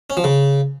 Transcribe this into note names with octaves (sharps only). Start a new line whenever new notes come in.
C#4
F3
C#3